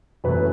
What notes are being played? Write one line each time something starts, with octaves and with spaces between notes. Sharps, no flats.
F#2 C#3 E3 A3 B4